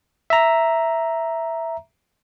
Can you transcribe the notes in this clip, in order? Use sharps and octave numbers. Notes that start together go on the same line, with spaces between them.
E5 A#5